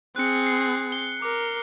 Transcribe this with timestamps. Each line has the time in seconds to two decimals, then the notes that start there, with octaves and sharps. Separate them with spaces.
0.16 C4 G#4 F#6 C#7
0.47 C7
0.92 G7
1.22 A#4 D6